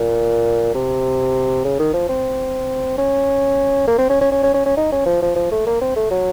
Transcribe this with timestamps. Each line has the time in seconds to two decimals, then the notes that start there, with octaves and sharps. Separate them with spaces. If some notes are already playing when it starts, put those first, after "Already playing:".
Already playing: A#2
0.74 C3
1.64 C#3
1.79 D#3
1.93 F3
2.09 C4
2.98 C#4
3.87 A#3
3.98 C4
4.09 C#4
4.21 C#4
4.32 C#4
4.43 C#4
4.54 C#4
4.66 C#4
4.77 D#4
4.92 C#4
5.06 F3
5.22 F3
5.36 F3
5.51 A3
5.66 A#3
5.81 C4
5.96 A3
6.11 F#3